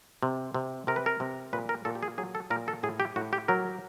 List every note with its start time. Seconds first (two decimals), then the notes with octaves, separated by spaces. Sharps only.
0.23 C3
0.54 C3
0.87 C3 A#4
0.96 B4
1.06 A#4
1.20 C3
1.53 A#2 B4
1.69 A#4
1.85 A#2 A4
1.95 G4
2.03 G#4
2.18 F#3 G#4
2.35 A4
2.50 A#2 A#4
2.68 A4
2.83 A2 G#4
3.00 G4
3.16 A2 F#4
3.33 G4
3.48 F#3 A#4